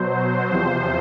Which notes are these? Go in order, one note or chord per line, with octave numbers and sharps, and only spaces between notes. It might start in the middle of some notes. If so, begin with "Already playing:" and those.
Already playing: B2 F#3 C5
E2 C3 F3 C5